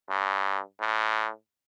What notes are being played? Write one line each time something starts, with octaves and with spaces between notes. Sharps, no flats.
G2
A2